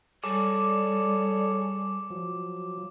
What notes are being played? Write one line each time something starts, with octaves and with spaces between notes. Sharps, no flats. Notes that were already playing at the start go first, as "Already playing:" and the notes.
G3 G#4 A4 C#5 D6
F3 F#3